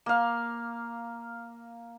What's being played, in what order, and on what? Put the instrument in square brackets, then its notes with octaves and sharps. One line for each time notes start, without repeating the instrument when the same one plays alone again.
[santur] A#3 F5